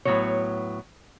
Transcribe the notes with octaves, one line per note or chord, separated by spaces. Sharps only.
A2 F3 F#3 B3 C#5